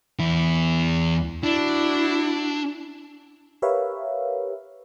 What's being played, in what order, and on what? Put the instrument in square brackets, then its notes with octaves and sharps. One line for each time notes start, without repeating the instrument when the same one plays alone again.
[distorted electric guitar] E2 E4
[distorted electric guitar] D4 [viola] E4 F#4
[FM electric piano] G4 A#4 B4 C#5 E5 F5